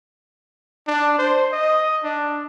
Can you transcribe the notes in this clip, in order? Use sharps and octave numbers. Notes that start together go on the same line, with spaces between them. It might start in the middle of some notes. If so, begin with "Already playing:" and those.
D4
C5
D#5
D4